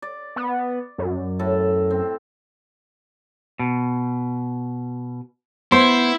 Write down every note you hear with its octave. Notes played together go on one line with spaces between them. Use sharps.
D5
B3
F#2
A2 A4
C4
B2
B3 E4 C5